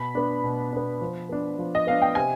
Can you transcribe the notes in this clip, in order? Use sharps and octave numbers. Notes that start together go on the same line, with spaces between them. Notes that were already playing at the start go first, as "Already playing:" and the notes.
Already playing: B2 B5
B3 D4
B2
B3 D4
F3
B3 D4
F3
D#5
B3 D4 F5
G5
C3 G#5